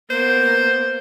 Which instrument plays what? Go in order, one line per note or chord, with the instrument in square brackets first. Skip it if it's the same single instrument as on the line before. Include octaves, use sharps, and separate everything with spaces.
[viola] A#3 B3 [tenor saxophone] C5